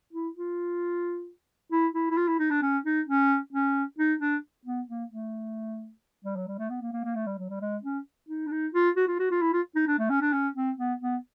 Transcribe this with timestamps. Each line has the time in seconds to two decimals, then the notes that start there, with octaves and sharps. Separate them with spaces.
0.13 E4
0.35 F4
1.71 E4
1.94 E4
2.11 E4
2.17 F4
2.28 E4
2.39 D#4
2.50 D4
2.62 C#4
2.85 D#4
3.07 C#4
3.53 C#4
3.98 D#4
4.20 D4
4.65 B3
4.88 A#3
5.11 A3
6.24 G3
6.36 F#3
6.47 G3
6.59 A3
6.70 B3
6.81 A#3
6.93 A#3
7.04 A#3
7.15 A3
7.26 G3
7.38 F#3
7.49 G3
7.61 G#3
7.83 C#4
8.28 D#4
8.47 D4
8.51 D#4
8.74 F4
8.96 F#4
9.08 F4
9.19 F#4
9.31 F4
9.41 E4
9.53 F4
9.75 D#4
9.87 D4
9.98 A3
10.09 C#4
10.21 D4
10.32 C#4
10.55 C4
10.78 B3
11.01 B3